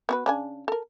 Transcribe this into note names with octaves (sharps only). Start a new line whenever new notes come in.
B3 F#4 B4
C#3 D4 G#5
A4 A#4